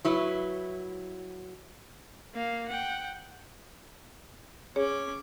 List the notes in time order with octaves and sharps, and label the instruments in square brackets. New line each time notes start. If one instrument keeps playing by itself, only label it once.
[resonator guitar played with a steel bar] F#3 E4 B4
[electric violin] A#3 F5
F#5 G5
[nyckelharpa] C#4 D6 [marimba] G#4 C#5